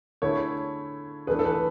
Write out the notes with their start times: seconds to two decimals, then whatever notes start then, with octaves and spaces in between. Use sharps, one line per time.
0.22 D3 A3 E4 G#4 C#5
1.27 E3 A3 D4 G#4 B4
1.39 A4
1.45 B4